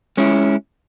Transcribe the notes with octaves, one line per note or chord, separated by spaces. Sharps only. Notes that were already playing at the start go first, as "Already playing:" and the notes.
G#3 C#4 E4